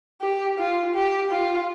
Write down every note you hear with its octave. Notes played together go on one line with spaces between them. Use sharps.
G4
F4
G4
F4